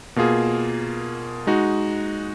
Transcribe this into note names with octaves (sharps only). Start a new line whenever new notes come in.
B2 A#3 F4 G#4
G#3 D#4 F#4